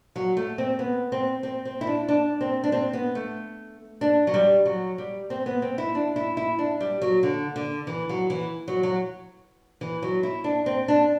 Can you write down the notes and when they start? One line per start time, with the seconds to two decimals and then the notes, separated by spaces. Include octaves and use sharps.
0.16 F#3
0.37 A3
0.58 C4
0.79 B3
1.12 C4
1.43 C4
1.65 C4
1.81 E4
1.87 D4
2.08 D4
2.41 C4
2.64 D4
2.72 C4
2.93 B3
3.15 A3
4.01 D4
4.27 F#3
4.34 G3
4.65 F#3
4.98 G3
5.30 C4
5.46 B3
5.62 C4
5.78 E4
5.95 D4
6.16 E4
6.37 E4
6.59 D4
6.80 G3
7.02 F#3
7.23 D3
7.56 D3
7.87 E3
8.09 F#3
8.30 E3
8.68 F#3
8.83 F#3
9.81 E3
10.02 F#3
10.23 E4
10.44 D4
10.66 C4
10.88 D4